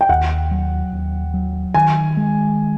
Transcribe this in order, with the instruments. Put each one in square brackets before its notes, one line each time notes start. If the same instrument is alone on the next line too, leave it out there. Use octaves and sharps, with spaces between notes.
[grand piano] G5
[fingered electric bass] D#2 [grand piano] F#5
[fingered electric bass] F#3
D#2
F#3
[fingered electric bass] D#3 [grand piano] G#5
[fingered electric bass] G#3